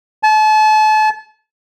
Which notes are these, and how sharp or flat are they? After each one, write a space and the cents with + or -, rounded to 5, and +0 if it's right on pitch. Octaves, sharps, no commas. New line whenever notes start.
A5 -35